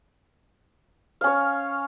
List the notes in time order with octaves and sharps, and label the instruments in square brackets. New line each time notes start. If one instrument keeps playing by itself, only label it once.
[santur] F5
C#4
C#5